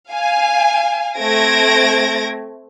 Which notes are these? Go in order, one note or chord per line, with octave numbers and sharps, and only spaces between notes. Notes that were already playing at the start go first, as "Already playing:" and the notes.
F5 G#5
A3 C4 G#6 A#6 D7